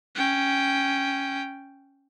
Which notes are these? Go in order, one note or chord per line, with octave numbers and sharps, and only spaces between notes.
C#4 G5